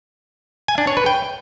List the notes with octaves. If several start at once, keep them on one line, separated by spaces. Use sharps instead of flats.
G#5
D4
C#5
B4
G5